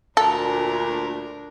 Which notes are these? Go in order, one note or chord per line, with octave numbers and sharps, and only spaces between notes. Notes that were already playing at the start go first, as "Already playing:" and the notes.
D2 A#2 D4 A4 A#4